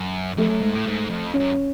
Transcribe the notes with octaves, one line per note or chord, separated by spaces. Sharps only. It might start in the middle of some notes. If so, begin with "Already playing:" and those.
Already playing: F#2
F2 A3
F#2
G#2
A2
G#2
F2
C#4
F#2